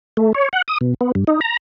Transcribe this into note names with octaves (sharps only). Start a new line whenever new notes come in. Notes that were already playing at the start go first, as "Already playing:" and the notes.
A3
C#5
F#5
D#6
B2
B3
G2
D#4
A#5